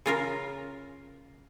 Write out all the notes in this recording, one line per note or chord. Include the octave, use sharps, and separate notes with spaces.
C#3 F4 A#4